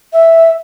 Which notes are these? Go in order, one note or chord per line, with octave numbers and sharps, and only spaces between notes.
E5